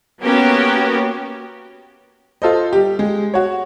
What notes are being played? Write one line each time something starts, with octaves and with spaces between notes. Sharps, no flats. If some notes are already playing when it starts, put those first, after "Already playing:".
A#3 B3 C#4 F#4 G4 A#4
F4 A4 C5 D#5
G3 G4
G#3
F#4 C#5